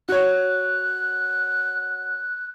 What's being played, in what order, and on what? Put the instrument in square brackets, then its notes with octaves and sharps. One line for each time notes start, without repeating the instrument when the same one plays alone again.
[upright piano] F#4 C#5 [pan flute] F#6